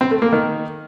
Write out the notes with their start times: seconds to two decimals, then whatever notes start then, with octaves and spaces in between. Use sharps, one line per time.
0.01 C4
0.11 A3
0.22 A#3
0.32 D#3